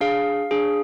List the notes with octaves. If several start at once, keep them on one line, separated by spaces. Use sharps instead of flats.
D4 G#4 F5
D4 G#4